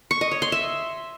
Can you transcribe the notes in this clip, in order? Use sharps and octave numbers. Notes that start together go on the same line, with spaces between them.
C#6
D#5
C#5
C6
E5